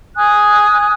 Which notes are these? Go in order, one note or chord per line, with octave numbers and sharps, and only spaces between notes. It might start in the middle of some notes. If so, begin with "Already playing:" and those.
G#5 D#6 F#6